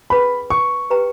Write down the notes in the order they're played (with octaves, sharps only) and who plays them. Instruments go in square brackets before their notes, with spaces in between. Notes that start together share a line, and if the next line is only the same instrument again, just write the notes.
[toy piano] C#4 G#4 B4 [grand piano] B5
[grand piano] C#6
[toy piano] G4 B4 G5 A#5